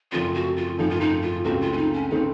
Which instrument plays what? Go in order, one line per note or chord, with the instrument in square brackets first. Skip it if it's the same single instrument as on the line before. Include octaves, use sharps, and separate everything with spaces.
[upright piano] F#2 C#3 F3 A3 C4 [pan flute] F4
[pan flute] F#4
F4
[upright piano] F#2 C#3 F3 A3 C4 [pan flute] D#4
[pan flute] F4
D#4
F4
[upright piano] C#2 C#3 A3 C4 [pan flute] F#4
[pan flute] F4
C#4
D#4
C#4
[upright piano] C#3 A3 C4 [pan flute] D#4